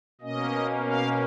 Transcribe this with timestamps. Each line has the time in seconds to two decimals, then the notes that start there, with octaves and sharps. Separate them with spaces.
0.21 B2 A#3 C#4 D#5
0.86 F5